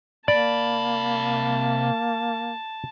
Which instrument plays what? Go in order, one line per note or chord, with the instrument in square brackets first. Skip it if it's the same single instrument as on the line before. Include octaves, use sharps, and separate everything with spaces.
[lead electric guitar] C3 B5 [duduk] A#3 [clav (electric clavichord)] D5 [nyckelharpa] A5